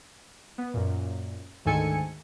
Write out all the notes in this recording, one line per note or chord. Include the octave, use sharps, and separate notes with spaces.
B3
F#2 A#2
D2 G#2 D#3 A4 G#5 C#7